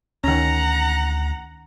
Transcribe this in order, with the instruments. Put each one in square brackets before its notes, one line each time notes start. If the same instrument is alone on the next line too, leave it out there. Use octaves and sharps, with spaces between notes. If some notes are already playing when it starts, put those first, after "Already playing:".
[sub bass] D2 [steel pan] D#3 C#4 [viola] F#5 A#5